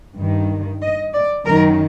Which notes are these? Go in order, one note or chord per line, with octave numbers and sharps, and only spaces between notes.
G2 D#3
D#5
D5
F#2 D#3 A#4